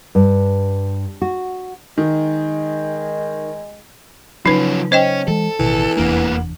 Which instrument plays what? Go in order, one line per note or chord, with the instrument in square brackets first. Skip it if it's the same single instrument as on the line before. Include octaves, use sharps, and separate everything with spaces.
[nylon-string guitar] G2
F#4
[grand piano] D#3 [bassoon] G#3
[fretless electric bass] C#3 F#3 [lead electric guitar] F3 C#4 [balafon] D#4 B4
[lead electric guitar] C#4 [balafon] C5 D#5 G5
[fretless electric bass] E3 G#3 [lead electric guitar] A4
[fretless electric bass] A1 B2 D#3 [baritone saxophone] E3
[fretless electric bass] F1 E2 D4 [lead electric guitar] A#3 B3